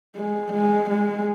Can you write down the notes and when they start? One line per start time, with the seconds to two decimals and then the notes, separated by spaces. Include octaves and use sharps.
0.16 G#3
0.53 G#3
0.90 G#3